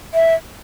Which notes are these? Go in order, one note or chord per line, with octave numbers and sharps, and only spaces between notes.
E5